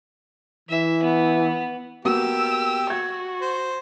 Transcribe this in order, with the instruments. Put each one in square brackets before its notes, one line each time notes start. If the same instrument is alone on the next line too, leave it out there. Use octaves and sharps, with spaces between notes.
[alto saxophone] E3 [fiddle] E5
[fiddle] B3
[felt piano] A#3 B3 F#4 [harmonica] G4 [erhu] E6
[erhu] F#4 [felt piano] G#6
[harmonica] C5